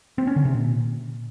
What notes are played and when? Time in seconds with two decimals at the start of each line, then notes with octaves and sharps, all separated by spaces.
0.18 C4
0.27 C#4
0.36 D3
0.45 C3
0.54 A#2